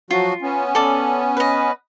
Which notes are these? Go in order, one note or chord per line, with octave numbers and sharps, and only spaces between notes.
F3 F#3 F4 F#4
B3 C#4
A4 D5
B4 D#5